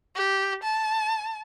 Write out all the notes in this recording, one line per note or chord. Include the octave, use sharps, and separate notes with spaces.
G4
A5